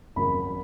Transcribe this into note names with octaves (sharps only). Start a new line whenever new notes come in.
G#1 F#2 C#3 F#3 B5